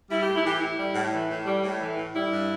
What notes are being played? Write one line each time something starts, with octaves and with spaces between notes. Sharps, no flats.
G3 E4
A2 G4
E4
E3 G4
A2 E4
G3
A2
E3
A2
G3
A2
E3
A2
G3 E4
G2